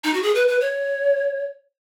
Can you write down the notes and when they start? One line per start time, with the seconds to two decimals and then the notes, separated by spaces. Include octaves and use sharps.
0.04 D#4
0.14 F#4
0.22 G#4
0.35 B4
0.48 B4
0.61 C#5